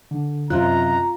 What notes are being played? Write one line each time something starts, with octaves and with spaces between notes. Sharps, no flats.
D3
F#2 C3 F4 D#5 A#5 F#6